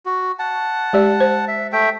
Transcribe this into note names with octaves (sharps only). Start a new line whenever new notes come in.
F#4
F#5 A5
G#3 G4 D5
C5
E5
A3 E5 G5